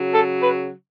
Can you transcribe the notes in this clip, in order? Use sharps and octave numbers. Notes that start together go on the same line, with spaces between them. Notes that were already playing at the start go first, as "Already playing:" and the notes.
Already playing: C#3 F#3
A4
B4